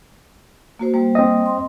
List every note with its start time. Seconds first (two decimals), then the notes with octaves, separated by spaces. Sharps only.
0.79 A#3 F#4 C5
0.94 G3 A#3 C5
1.15 C4 D#5
1.46 C6